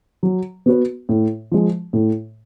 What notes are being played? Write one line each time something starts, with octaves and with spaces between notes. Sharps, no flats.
F#3
B3 F#4 B4
A2
F3 G#3
A2